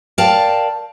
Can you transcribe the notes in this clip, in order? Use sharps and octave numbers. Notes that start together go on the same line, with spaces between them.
A#4 D5 F5 G5 A5